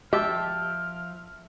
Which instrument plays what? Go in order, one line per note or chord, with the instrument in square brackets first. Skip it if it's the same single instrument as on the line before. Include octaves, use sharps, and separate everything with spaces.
[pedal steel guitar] F3 G5 A5 [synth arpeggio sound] G#3 F#4 G4 [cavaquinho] E5 [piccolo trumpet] F6